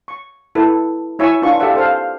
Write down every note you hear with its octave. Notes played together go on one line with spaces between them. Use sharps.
C#6
E4 A4 B4
E4 C#5 E5 G#5 C#6 E6
D4 D#4 F4 B4 C#6
F4 G4 A4 D5 E5 F#5
A4 C5 F5